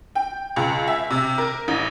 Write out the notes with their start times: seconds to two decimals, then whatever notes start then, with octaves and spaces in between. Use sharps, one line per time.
0.15 G5
0.56 C#2
0.87 E5
1.10 C3
1.38 A#4
1.68 A1